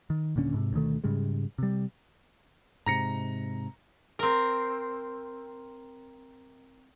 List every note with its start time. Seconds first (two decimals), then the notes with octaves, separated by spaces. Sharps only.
0.10 D#3
0.36 D#1 A#2 D3 C#4
0.54 G#2 C3
0.73 D2 B2 D#3 A3
1.04 G#2 C#3 G3 G#3
1.58 C3 G3
2.86 G#2 C3 G#3 A#5 A#6 C#7
4.19 C4 A#4